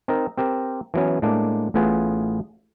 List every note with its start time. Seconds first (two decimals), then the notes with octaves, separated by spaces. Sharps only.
0.08 C4 D#4 A#4
0.37 C4 G4 A#4
0.94 E3 F#3 B3 C#4
1.22 A2 G#3 A#3 D4
1.74 A1 A2 B3 F4 G#4 B4